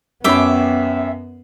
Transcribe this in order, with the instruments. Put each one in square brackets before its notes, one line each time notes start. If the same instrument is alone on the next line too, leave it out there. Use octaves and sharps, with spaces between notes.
[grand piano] F#2 C#4 B5 [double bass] B3 [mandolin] E5 G5 D6